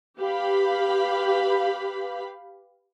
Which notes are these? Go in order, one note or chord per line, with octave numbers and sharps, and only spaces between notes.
G4 B4 F5 B5